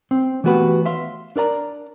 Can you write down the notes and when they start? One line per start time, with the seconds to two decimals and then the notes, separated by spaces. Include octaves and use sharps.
0.11 C4
0.44 E3 A3 B3 F#4 G4 B4
0.86 E5 F5 C6
1.36 D4 A#4 D5 A#5